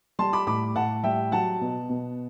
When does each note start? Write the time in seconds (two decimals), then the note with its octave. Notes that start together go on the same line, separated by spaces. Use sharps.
0.19 G3 A5 C6
0.33 B5 D6
0.47 A2 B5 D6
0.75 A2 F#5 A5
1.03 G3 E5 G5
1.32 F#3 F#5 A5
1.61 B2
1.89 B2